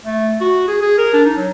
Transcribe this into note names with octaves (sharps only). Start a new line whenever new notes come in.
A3
F#4
G#4
G#4
A#4
D4
D#4
F#3